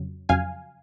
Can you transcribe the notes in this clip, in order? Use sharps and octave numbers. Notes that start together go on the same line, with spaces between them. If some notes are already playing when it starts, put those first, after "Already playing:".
Already playing: F2 C#3 F#3
F2 C#3 F#3 F5 G#5